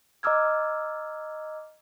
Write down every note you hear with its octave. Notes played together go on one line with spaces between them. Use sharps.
D#5 A#5 D6 E6 F6 G#6